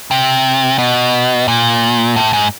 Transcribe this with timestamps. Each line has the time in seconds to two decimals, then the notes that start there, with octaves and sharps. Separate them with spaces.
0.11 C3
0.78 B2
1.48 A#2
2.16 A2
2.33 G#2